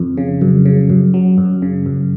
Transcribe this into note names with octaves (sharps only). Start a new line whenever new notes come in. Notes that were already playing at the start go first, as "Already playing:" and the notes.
Already playing: F2
C#3
F#2
C#3
F#2
F#3
F#2
C#3
F#2